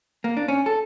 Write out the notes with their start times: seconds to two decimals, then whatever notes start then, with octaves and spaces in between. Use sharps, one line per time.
0.24 A#3
0.37 D4
0.48 C#4
0.66 A4